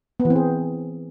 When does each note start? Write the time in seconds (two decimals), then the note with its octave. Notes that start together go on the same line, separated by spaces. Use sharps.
0.20 B3
0.25 E3
0.30 C4
0.36 G#4